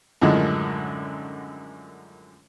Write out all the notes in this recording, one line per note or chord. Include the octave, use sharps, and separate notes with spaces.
F#2 A2 D3 D#3 F3 G#3